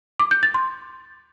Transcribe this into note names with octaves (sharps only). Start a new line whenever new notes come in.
D6
G6
A6
C6